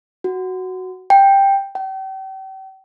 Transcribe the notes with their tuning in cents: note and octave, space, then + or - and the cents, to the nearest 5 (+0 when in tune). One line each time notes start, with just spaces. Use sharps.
F#4 +5
G5 +5
G5 -40